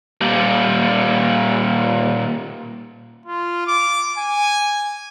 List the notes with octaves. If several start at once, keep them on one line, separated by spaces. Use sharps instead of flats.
A#2 G3
F4
D6
G#5